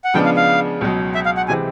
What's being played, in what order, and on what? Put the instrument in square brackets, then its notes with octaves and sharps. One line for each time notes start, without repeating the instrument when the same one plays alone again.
[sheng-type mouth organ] F#5
[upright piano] C#3 F3 G#3 B3 D4 [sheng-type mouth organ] G5
[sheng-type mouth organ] F5
F5
[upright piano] C#2 B2 F#3
[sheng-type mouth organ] E5
F5
F#5
[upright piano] C3 E3 G#3 C4 [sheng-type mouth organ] G#5